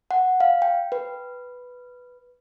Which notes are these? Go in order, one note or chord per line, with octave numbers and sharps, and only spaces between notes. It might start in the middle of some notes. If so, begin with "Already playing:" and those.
F#5
F5
G5
B4